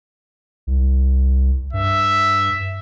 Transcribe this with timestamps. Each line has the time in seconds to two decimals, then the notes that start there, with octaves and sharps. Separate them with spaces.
0.67 C2
1.73 G2 E5